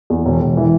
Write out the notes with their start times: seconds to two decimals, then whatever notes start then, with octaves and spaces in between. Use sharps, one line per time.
0.10 E2
0.25 E1
0.41 E1
0.57 E3